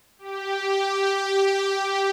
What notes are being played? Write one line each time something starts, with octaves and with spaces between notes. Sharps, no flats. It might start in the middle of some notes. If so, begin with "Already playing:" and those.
G4
G4